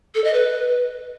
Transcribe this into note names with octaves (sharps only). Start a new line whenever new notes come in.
A4
D#5
B4